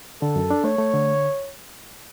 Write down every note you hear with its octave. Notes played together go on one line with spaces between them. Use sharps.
D3 A4
F#2
D4
A3 C#5
A3
D3